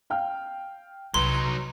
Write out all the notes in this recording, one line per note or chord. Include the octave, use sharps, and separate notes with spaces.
F5 G5 F6
C2 F#3 D#4 B4 C6